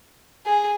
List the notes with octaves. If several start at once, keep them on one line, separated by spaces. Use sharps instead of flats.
G#4